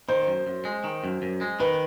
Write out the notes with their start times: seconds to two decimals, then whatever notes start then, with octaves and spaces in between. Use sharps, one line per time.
0.09 D#3 C5
0.27 F#2
0.47 F#2
0.65 G#3
0.84 D#3
1.04 F#2
1.22 F#2
1.41 G#3
1.60 D#3 B4